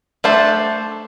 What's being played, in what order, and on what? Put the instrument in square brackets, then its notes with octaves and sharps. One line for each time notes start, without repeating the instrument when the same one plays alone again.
[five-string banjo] A3 D4 A4 C5